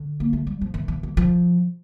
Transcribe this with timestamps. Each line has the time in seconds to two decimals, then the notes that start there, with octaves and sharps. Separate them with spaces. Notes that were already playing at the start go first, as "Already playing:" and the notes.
Already playing: D3
0.20 A#3
0.33 A3
0.47 G3
0.61 F3
0.74 E3
0.88 E3
1.03 E3
1.17 F3